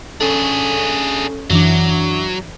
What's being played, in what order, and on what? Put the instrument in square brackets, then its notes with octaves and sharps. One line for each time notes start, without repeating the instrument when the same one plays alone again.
[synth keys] C#4 A4 [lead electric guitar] D4 G#4
[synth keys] F#2 E3 D4 [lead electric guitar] F#3